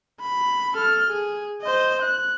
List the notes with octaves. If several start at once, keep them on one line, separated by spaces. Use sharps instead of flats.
B5
A4 F6
G#4
C5 D#5
F#6